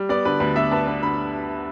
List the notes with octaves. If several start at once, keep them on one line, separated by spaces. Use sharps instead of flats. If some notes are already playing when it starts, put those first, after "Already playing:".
Already playing: G3
B3 D5
D3 B4
D2 B4
B3 E5
B3 A5
B3
D3 B5